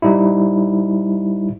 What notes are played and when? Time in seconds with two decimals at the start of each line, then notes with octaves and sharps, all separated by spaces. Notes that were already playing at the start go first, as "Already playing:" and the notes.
0.02 G3 D#4 E4